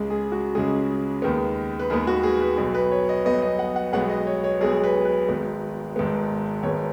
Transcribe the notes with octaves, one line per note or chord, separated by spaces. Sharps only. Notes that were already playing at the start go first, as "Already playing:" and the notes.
Already playing: C#2 C#3 G#3
G#4
F#4
C#2 C#3 G#3 G#4
D#2 D#3 G#3 B3
B4
D#2 D#3 G#3 B3 G#4
F#4
G#4
B4
B1 B2 B3
B4
C#5
D#5
B1 B2 B3 D#5
D#5
F#5
F#5
B1 B2 G#3 B3 F#5
D#5
C#5
C#5
B1 B2 G#3 B3 G#4
B4
B4
G#1 G#2 G#3 B3
G#1 G#2 G#3 B3
G#1 G#2 G#3 B3 C#5